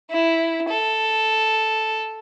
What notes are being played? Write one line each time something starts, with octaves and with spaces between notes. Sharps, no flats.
E4
A4